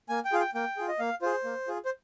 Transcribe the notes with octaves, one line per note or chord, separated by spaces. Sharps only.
A#3 G#5
G5
F4 G#4 F5
G5
A#3 G5
F4 G#4
D#5
A#3 F5
F4 G#4 C5
A#3
F4 G#4
C5